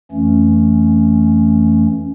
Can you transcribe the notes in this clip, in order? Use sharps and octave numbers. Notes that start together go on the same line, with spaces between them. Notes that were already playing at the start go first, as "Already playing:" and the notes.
F2 E3 A3 C#4